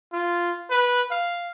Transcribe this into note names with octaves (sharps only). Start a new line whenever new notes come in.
F4
B4
F5